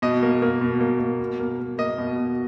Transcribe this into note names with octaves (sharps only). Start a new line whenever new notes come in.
B2 D#5
A#3
A#3
B2
A#3
A#3
B2
A#3
A#3
A#3 D#5
B2
B2